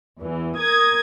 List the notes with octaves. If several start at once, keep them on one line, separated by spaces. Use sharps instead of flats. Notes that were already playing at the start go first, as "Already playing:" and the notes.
E2 E3
A#4 D#6 G#6